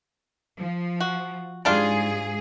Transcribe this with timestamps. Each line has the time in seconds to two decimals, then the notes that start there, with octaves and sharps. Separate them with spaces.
0.58 F3
1.00 F#4
1.65 G#2 G3 D4 F4 G#4